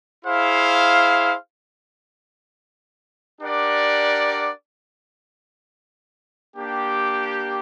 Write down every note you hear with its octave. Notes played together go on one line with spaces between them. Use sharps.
E4 G#4 C5 F5
D4 G4 A#4 D5 F#5
A#3 D4 G4